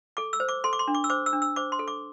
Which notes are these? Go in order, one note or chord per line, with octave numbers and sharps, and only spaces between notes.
A4 D6
E6
C5
D6
A4 C6
D6
C6
D4
D6
E6
C5 D6
E6
D4
E6
C5 D6
C6
A4
D6